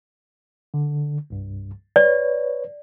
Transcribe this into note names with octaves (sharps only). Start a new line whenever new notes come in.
D3
C2 G2
B4 C#5 D5